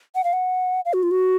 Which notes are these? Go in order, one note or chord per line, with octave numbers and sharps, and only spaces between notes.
F#5
F5
F#5
F5
F#4
F4
F#4